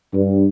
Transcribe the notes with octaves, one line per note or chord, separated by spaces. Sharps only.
G2